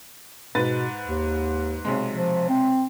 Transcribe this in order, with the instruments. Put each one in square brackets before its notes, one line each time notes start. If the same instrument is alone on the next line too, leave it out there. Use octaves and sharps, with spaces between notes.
[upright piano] G#2 B4 A6 [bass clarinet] B2
[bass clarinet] D#2
[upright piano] B1 C3 G#3
[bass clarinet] F3
C4